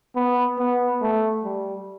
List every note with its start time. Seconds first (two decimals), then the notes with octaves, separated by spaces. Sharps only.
0.16 B3
0.59 B3
1.02 A3
1.44 G3